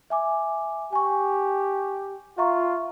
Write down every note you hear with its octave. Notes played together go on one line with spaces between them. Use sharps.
E5 G#5 D6
G4 G#5 C#6
F4 E5 A#5 C#6